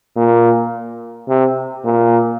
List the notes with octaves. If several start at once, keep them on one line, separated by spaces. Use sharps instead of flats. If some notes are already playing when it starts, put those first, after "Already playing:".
A#2
C3
A#2